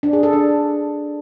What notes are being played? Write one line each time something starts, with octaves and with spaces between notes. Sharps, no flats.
D4
G#4
A4
D4